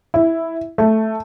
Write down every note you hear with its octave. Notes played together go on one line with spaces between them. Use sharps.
E4
A3